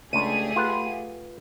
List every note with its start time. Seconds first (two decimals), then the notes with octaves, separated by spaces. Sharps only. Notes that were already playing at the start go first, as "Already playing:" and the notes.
0.13 C#2 A3 D4 G4 G#4 D#7
0.56 F4 B4 F#5